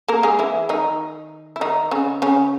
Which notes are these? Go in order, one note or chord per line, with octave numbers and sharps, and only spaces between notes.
A#3 A#4
G#3 G#4
E3 E4
D#3 D#4
E4
D#3 D#4
C#3 C#4
C#3 C#4